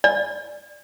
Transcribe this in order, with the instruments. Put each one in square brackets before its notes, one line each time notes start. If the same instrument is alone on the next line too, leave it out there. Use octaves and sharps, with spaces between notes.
[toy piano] D5